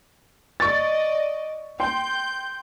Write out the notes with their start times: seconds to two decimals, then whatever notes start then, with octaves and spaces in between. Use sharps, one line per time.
0.60 D5 D#5 C#6 A6
1.80 G5 C6 G6